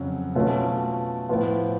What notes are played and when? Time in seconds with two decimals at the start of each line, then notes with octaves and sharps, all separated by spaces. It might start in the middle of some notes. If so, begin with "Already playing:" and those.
Already playing: F2 C#3 F#3
0.35 B2 A3 C#4 F4
1.29 A2 F3 B3 F4